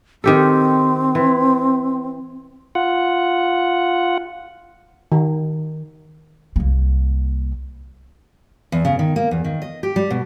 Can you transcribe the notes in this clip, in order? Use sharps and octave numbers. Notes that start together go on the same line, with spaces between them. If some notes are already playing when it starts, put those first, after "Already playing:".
D#3 C4 G4 A4
E3
F4 F#5
D#3
C2 A#3
E2
C#3
D#3
A#3
E2
D#3
D#5
G4
G3
B2